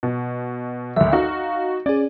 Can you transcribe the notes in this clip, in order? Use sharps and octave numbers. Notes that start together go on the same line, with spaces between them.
B2
G#1 D2 E5
D#4 F#4 F5
C#4 G#4 D5